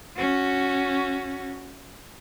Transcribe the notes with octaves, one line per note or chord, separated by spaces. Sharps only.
C#4 F#4